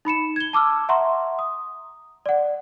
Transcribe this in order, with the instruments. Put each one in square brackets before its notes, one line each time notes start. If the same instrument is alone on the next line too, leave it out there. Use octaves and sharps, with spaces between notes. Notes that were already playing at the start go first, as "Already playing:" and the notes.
[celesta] D#4 B5 C#7 E7
G#6 G7
A5 D6 E6 F6
E5 F#5 A#5 C6 C#6
D#6
D5 F#5